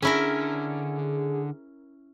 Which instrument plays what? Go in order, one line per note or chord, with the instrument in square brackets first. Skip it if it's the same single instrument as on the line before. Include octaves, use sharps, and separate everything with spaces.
[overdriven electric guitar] D3 D4 [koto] C#4 E4 A#4 [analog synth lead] G#4